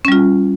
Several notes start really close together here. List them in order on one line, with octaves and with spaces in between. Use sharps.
C#4 G3 F4